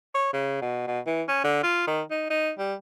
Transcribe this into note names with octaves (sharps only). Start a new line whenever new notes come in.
C#5
C#3
B2
B2
E3
C#4
D3
F4
D#3
D#4
D#4
G3